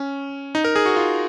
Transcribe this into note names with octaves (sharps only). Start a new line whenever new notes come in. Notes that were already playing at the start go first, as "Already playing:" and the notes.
Already playing: C#4
D#4
A#4
G#4
F#4
F4